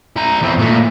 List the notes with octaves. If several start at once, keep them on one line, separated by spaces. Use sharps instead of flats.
E4 A#5
E2 C4
A#2 A3